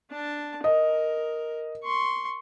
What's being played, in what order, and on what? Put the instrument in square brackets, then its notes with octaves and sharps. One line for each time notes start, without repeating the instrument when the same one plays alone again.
[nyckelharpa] D4 A5
[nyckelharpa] A#4 [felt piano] D#5
[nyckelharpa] C6 C#6